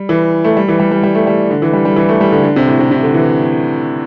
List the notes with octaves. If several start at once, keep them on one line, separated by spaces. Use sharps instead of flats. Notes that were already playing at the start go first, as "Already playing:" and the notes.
Already playing: G3
E3
A3
G3
E3
G3
G3
G3
A3
G3
D3
E3
G3
G3
E3
A3
G3
D3
D3
C3
A2
C3
C3
D3
E3